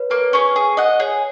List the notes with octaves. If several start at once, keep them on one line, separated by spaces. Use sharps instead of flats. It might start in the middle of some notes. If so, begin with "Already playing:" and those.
Already playing: B4 C#5
A#3 B4
C#4 G#4
G#4
D#5 F#5
G#4 C#5